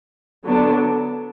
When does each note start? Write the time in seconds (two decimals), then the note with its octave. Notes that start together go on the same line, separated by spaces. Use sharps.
0.44 D3 F#3 B3 D4